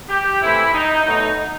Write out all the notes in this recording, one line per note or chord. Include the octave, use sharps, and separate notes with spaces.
G4
C3 E3 A3 E4
D#4
B2 F#3 A3 D#4